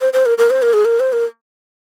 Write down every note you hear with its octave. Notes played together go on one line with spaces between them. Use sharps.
C5
C5
A#4
A#4
C5
A#4
G#4
A#4
C5
A#4